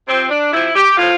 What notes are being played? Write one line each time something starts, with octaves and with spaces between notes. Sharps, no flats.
C3 F3 C4
D4
C3 F3 E4
G4
A2 F3 F4